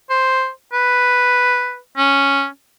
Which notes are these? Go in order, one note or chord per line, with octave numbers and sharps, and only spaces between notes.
C5
B4
C#4